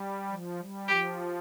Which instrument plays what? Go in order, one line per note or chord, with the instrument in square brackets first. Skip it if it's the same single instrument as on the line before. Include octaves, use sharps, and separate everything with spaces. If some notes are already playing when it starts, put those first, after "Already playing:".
Already playing: [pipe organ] G3
F3
G3
[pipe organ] F3 [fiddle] G4